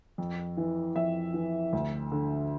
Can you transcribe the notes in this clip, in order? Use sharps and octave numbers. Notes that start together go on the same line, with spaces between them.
F2
E3
F2 E5
E3
D2
D3